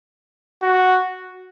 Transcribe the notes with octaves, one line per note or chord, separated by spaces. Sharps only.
F#4